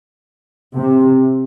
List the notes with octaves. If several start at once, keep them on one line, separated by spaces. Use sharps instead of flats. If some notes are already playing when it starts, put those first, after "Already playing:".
C3